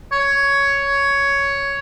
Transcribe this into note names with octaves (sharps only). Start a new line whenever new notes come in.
C#5